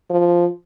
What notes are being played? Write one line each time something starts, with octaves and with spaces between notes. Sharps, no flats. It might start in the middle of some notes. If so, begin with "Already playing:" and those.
F3